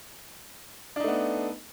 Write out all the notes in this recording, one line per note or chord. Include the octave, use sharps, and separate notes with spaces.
A3 B3 D4 D#4